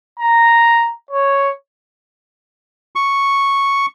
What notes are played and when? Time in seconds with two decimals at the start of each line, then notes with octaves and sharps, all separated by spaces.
0.20 A#5
1.11 C#5
2.96 C#6